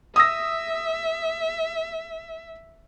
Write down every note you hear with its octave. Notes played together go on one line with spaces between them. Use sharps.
E5 D#6 E6 A#6